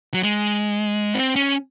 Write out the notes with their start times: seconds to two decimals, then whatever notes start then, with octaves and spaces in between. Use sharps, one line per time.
0.14 F#3
0.23 G#3
1.14 C4
1.36 C#4